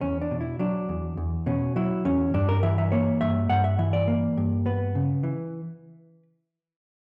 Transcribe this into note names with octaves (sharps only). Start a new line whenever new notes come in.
E2 C#4
D4
B2
E4
F#3 D4
E2
E2
B2 C#4
F#3 E4
E2 C#4
G2 D4
A#4
E3 E5
E5
A#3 C#5
G2 E5
G2 F#5
E5
E3 E5
D5
A#3
G2
B3 B4
C#3
E3